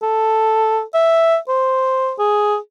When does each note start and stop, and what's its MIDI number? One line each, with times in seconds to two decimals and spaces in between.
0.02 0.82 69
0.94 1.37 76
1.49 2.13 72
2.19 2.57 68